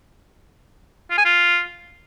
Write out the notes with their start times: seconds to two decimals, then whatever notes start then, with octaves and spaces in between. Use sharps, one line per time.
1.11 F4
1.18 G#5
1.25 F4